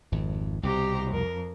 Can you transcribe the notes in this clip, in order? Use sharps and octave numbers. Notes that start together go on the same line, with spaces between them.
G#1 F2
C2 B2 G4 C5 A#5
F2 A#4